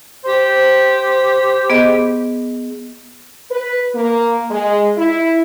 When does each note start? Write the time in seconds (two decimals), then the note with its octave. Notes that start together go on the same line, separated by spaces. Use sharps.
0.25 G4 C5
1.70 B3 G#4 D#5
3.51 B4
3.95 A#3
4.50 G#3
4.97 E4